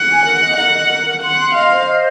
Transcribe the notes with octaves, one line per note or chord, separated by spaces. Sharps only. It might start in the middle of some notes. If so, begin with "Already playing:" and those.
Already playing: F#5
G#5
A#4
D#5
A#4 F#5
D#5
A#4
A#4
F#5 C6
C6
D#5 F5
C5
D#5